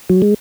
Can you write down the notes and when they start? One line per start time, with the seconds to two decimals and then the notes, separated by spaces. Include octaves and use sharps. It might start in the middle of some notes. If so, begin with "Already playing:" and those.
0.10 F#3
0.22 G#3